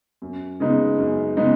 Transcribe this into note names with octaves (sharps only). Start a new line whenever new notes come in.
F#2
C#3 G#3 B3 D#4
F#2
C#3 G#3 B3 D#4